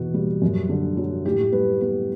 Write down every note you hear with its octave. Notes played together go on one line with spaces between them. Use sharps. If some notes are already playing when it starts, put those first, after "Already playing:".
Already playing: E2 B2 F#4
G3
F#2
D3
F#3
A2 G4
G3 B4
B3 B4